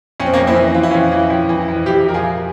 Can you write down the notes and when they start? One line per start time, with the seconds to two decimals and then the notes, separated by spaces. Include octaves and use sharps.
0.20 F2 C#4
0.26 C4
0.34 A#3 C#4
0.38 F2
0.47 C4 E4
0.56 E3
0.74 E3 F4
0.83 E4
0.91 F2 C#4 F4
1.11 E3
1.30 F2
1.49 E3
1.68 F2
1.86 F2 E4 G4
2.05 F2 A#4
2.14 F4 G#4
2.23 F2